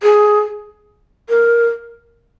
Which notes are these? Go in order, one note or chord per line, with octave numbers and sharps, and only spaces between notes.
G#4
A#4